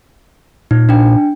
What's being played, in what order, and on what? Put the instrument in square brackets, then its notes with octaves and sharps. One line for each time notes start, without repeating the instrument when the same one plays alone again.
[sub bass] A#2 [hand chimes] D#4
[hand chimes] D4 G5